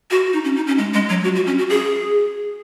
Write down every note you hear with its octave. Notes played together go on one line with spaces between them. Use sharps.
F#4
D#4
C#4
D#4
C#4
G#3
G#3
F#3
F#4
F#4
C#4
F#4
G#4